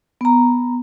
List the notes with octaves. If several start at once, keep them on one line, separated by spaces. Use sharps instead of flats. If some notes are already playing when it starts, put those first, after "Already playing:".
B3 A#5